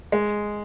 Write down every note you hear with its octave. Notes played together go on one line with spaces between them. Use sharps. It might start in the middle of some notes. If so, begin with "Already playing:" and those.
G#3